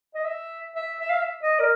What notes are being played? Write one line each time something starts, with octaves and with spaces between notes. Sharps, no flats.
D#5
E5
E5
E5
F5
E5
D#5
A#4